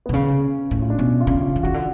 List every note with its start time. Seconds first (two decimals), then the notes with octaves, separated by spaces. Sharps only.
0.06 B3
0.09 B2
0.13 C#3 C#4
0.71 A2
0.82 F4
0.90 D4
0.98 B2 C#4
1.20 F4
1.27 C#3
1.42 F4
1.56 D3
1.63 C#3 F#4
1.74 D3